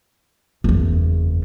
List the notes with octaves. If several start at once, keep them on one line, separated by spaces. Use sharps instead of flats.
F#1 E2